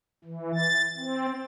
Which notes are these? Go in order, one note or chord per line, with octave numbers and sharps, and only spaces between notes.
E3
A6
C4